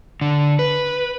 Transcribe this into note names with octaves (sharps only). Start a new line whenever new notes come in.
D3
B4